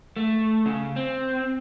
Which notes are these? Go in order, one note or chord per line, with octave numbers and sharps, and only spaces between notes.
A3
C#3
C4